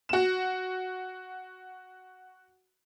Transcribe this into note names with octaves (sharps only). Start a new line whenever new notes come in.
F#4 E7